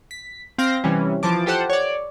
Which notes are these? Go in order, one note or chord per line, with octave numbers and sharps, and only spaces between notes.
B6
C4 F5 G6 A#6
C3 E3 G3 C#4
E3 F3 A5 D6
F4 G4 A4 C5 F#5
C#5 D5